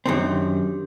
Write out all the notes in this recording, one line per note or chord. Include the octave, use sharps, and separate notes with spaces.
F#2 D#3 C4 D4 G4